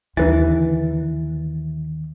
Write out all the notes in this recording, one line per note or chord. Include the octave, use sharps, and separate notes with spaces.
D#2 D3 E3 D#4 B4 A6